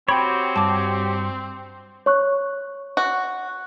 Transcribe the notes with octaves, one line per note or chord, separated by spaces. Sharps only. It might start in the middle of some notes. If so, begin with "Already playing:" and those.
C4 F#4 G4 C#5 G5 B5
G2 A5 D6
C#5 C#6 F#6
F#4